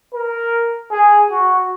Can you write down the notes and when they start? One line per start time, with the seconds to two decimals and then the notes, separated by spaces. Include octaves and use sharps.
0.14 A#4
0.91 G#4
1.30 F#4